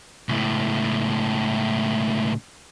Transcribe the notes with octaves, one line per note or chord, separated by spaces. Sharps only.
C#2 A2